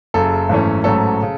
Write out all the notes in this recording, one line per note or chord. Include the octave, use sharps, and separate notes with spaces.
F#1 F#2 C#3 A4
G#1 F#2 E3 A3 C#4
A1 G#2 F#3 A3 C#4 A4
C#3